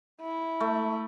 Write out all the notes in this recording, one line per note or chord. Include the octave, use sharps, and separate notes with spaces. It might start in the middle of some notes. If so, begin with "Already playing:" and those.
E4
A3